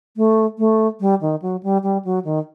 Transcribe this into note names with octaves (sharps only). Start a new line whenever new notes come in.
A3
A3
G3
D#3
F#3
G3
G3
F#3
D#3